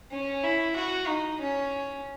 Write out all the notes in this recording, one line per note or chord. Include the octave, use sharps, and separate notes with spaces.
C#4
E4
F#4
D#4
C#4